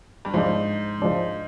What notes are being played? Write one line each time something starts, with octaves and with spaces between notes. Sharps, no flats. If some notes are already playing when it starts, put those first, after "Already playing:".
G2
G#2 F3 G#3 D4
F3 G#3 D4